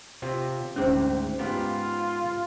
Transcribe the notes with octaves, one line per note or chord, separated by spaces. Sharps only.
C3 C4 F4
D2 G#2 C4 C#4 G#4 C5
G#2 B3 F4 G4